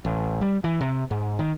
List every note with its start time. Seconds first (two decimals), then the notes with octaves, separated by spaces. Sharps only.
0.05 A1
0.41 G3
0.64 E3
0.81 C3
1.11 G#2
1.39 D#3